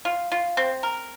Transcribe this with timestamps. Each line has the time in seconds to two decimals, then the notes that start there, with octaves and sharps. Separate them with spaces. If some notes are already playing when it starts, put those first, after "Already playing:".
0.05 F4
0.32 F4
0.57 C4
0.83 A#4